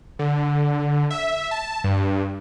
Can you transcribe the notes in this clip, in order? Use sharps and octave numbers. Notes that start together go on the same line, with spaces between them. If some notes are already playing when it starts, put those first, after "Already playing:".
D3
E5
A5
G2